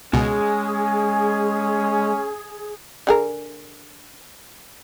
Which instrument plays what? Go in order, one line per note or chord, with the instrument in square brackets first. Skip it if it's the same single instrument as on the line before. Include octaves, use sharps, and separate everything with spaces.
[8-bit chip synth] C#2 B2 [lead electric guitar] G#3 [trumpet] C#4 [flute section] G#4
[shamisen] D3 G#4 A#4